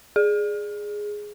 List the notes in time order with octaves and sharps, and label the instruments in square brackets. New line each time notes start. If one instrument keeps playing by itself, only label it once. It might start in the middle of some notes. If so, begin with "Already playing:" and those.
[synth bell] G#4